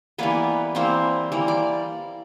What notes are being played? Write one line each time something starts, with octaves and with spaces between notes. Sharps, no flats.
E3 G3 A#3 B3 B4
E3 G3 A#3 C4 C5
E3 G3 A#3
D5